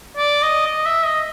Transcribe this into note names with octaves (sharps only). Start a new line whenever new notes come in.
D5
D#5
D#5
E5
D#5